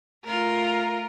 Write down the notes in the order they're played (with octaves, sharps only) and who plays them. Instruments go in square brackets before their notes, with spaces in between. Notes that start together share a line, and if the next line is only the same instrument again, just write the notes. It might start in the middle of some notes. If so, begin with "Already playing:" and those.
[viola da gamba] A3 F4 [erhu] A#4